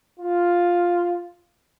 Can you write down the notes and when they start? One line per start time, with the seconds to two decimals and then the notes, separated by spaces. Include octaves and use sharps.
0.20 F4